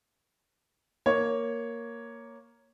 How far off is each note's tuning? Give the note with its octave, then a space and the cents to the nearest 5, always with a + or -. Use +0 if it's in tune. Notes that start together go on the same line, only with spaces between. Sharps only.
A#3 +0 C#5 +0